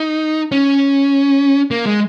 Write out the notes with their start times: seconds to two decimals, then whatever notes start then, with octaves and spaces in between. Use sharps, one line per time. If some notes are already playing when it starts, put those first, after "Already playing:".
Already playing: D#4
0.52 C#4
1.71 A#3
1.86 G#3